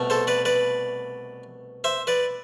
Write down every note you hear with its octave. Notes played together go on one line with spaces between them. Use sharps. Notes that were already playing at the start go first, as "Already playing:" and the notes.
Already playing: C2 B2 A3
A4 C5
B4 D5
B4 D5
C5 E5
B4 D5